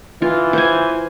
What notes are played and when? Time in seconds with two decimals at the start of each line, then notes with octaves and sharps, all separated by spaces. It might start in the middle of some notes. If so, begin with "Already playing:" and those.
0.22 E3 F4
0.53 C5 G#5